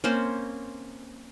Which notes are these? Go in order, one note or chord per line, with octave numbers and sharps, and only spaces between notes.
A#3 C4 C#4 C5